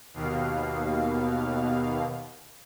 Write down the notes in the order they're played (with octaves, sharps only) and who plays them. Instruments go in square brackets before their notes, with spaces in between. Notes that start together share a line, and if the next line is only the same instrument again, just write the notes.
[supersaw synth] D#2 B2 F5